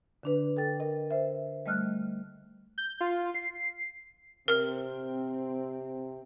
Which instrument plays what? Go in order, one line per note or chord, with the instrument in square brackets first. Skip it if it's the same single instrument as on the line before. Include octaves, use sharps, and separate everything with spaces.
[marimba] D3 D4 B4
A4 G5 A6
A#4 D#5
C5 E5
G3 A3 D#5 F6 F#6
[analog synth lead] G6
F4
C7
[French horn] C3 [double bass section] C4 [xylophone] A#4 F6